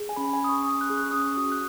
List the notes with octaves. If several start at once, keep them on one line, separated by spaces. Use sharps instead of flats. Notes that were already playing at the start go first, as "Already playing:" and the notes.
Already playing: G#4
G#5
C#4 B5
G#5
G#4 D#6
C#6
C#4 D#6
F#6
G#4
F#6
C#4 D#6
C#6
F#4 D#6
F#6